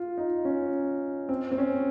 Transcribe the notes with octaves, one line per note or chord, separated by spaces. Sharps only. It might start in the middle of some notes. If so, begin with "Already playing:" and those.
Already playing: F4
D#4
C#4
C4
C4
C#4